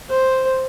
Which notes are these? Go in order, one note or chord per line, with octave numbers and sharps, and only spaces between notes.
C5